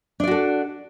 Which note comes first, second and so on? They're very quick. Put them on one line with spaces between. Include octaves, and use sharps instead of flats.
D4 D5 F#4 A4